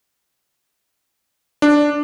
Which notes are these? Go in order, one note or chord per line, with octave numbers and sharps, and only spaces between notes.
D4